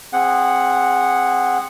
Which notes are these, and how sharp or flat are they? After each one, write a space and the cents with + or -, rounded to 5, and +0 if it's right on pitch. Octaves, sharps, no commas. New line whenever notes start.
C4 +10 G#4 -20 F#5 +0